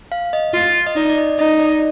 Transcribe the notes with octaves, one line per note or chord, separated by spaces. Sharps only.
F5
D#5
F4
D#5
D#4 D5
D5
D#5
D#4 D#5
D5